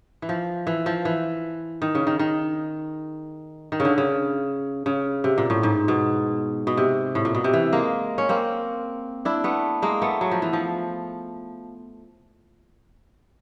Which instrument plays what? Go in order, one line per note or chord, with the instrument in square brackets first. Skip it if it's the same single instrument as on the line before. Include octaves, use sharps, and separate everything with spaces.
[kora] E3
F3
E3
F3
E3
D#3
C#3
D#3
D#3
D#3
C#3
D3
C#3
C#3
C3
A#2
A2
G#2
B2
B2
C3
A2
A#2
B2
C3
E3
G#3 A#3
C#4
A#3 C4
D4 E4
A3 B3
G#3 A#3
A3 B3
F#3
F3
E3
F3